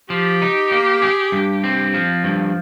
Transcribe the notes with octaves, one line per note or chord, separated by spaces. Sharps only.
F3 G4
D#4
A#3
G#4
G2
C4
F3
G2